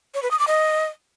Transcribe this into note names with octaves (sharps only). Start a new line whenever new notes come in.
C#5
B4
D#6
D6
D#5